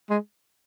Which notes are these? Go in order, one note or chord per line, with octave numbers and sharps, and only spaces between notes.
G#3